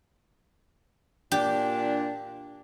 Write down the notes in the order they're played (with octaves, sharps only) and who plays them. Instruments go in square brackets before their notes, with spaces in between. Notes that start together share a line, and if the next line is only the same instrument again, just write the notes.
[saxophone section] A#2 D4 [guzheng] G4